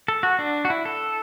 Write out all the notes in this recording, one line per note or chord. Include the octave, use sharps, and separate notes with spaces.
A4
F#4
D4
F#4
E4
A4